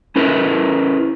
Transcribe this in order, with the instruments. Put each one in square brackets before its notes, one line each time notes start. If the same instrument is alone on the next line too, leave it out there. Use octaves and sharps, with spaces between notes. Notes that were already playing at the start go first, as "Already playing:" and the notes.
[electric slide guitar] C#4 E4 A#4 B4